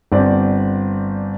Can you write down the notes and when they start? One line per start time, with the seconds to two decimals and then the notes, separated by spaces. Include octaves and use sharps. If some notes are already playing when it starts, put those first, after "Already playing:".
0.12 G1 C4 D5